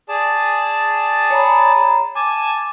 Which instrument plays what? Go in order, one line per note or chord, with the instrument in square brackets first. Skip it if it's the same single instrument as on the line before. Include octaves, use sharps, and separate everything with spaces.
[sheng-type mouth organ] G#4 D5 A5
[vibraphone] C#5 A#5 B5
[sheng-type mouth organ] G#5 A5 [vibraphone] D6